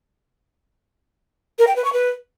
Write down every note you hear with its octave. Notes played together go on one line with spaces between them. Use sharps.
A#4
G5
B4
C#6
B4